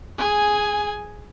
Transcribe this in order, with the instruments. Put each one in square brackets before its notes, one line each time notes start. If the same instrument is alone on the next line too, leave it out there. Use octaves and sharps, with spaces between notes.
[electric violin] G#4 G#5